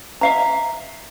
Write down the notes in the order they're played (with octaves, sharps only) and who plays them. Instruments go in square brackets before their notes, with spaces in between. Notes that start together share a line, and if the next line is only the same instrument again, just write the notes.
[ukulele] E5 F5 A#5